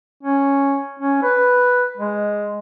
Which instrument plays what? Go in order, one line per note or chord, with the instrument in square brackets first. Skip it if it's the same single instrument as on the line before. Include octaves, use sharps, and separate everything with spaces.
[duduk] C#4
C#4
B4
G#3